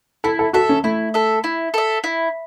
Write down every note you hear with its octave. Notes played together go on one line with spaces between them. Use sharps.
E4 A4
A4
F#4 A4 E5
C#4
A3 E4
A4 E5
E4
A4 E5
E4